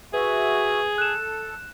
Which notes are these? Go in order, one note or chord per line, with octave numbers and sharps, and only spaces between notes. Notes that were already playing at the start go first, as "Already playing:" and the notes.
F#4 G#4 B4 E5
A4 F#6 E7